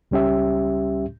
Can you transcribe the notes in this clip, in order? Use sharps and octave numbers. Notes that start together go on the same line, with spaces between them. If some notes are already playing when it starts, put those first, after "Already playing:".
C#2 G3 C#4 G4 E5